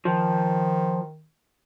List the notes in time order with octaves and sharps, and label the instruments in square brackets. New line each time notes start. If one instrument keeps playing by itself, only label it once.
[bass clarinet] D#3 [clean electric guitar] F3